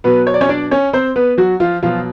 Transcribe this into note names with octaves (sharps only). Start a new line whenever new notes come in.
B2 F#3 B3 B4
C#5
D5
C#4 C#5
D4 D5
C#4 C#5
C4 C5
B3 B4
F#3 F#4
F3 F4
B2 F3 F#3 F4